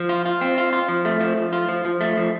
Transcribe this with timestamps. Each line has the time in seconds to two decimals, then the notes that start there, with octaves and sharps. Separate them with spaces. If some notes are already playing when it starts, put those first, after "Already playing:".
Already playing: F3
0.09 F4
0.25 F4
0.41 C4
0.58 F4
0.73 F4
0.88 F3
1.05 A3
1.21 F3
1.37 F3
1.53 F4
1.69 F3
1.85 F3
2.01 A3
2.17 F3